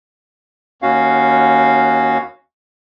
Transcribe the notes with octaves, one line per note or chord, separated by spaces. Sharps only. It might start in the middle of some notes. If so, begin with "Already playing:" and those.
D#2 C#4 F#4 F5